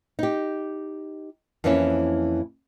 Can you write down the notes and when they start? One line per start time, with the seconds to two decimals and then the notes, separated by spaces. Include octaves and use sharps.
0.19 D#4 G4
1.64 F2 E3 A#3 C#4 E4